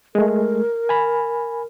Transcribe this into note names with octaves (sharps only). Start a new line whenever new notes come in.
G#3 A3 A#4
G#5 B5